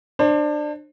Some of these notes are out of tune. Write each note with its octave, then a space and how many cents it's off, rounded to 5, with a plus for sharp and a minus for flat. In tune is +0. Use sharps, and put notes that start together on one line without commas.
D4 +25 C5 +35